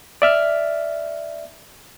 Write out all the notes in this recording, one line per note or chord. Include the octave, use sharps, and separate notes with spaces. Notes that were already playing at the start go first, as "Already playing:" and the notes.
D5 E5 F6